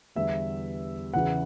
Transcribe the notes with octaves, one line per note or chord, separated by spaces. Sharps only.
E2 D3 G3 B3 E5
E2 C#3 E3 B3 F#5